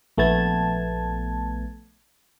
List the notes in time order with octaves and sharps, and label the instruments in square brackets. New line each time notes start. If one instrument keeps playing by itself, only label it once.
[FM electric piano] A#1 A3 B3 A5 G#6